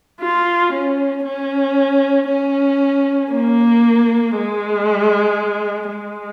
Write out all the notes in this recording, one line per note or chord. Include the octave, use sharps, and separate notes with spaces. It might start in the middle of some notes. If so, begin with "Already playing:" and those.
F4
C#4
C#4
C#4
A#3
G#3
G#3